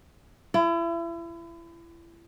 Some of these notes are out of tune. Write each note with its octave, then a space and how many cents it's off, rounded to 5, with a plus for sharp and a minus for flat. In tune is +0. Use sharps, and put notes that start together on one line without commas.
E4 +35